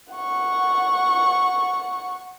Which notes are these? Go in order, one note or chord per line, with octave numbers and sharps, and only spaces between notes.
F#5 C#6